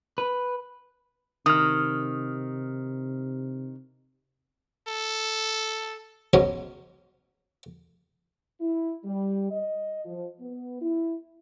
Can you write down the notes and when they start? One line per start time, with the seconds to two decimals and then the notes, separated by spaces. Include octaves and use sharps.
0.18 B4
1.46 C3 D#3 D#6 F6
4.88 A4
6.33 G#2 B2 F#3 G#3 B3 C#4
8.61 E4
9.05 G3
9.51 D#5
10.05 F3
10.40 B3
10.81 E4